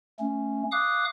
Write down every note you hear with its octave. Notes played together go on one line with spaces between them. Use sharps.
A3 C#4
F5 D6 D#6 F#6